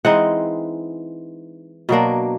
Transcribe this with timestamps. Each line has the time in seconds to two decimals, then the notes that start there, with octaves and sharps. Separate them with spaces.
0.05 E3 G#3 C4 D#4 F#5
1.89 B2 F#3 A#3 D4